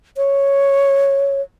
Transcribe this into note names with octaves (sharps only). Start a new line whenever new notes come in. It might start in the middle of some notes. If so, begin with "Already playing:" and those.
C#5